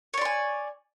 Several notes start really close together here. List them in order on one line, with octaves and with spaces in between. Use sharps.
C#5 D5 C6 G#5